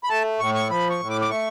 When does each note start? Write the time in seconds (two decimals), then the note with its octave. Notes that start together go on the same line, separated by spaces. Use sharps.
0.04 B5
0.09 A3 A5
0.39 A2 C#6
0.54 C#6
0.70 F3 B5
0.90 C#6
1.00 A2
1.10 D6
1.21 D6
1.29 A3 C#6